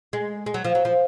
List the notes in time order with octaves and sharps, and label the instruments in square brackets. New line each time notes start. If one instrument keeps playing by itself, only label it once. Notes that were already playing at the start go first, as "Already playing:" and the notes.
[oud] G#3
G#3
F#3
F3
F#3
F3